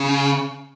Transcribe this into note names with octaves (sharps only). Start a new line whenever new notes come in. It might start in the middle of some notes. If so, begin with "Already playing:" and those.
Already playing: C#3